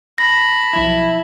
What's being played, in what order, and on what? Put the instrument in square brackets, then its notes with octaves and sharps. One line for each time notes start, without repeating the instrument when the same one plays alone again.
[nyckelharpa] A5 B5 [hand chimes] A#6
[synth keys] B1 F3 E7 [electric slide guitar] E4